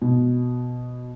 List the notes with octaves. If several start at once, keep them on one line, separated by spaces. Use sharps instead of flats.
B2